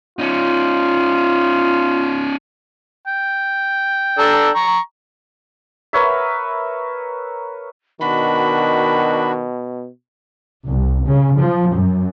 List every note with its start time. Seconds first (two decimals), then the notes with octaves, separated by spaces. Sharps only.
0.19 C#4 D#4 F4
3.07 G5
4.19 D4 A4 A#5
4.55 A#5 C#6
5.93 A#4 B4 C#5 E5
8.01 B2 D#3 D4 F#4 B5
10.64 C2
11.05 C#3
11.36 F3
11.71 F#2